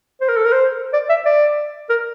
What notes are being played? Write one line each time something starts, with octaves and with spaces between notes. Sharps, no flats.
C5
A#4
A4
A#4
C5
D5
E5
D5
A#4